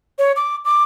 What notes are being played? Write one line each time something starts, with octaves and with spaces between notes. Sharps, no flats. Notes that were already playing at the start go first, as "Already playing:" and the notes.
C#5
D6
D6